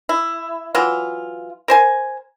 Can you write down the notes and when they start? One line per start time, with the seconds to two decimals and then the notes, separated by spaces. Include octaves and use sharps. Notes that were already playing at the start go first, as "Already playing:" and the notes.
0.09 E4
0.75 E3 F#3 F4
1.68 A#4 C5 G#5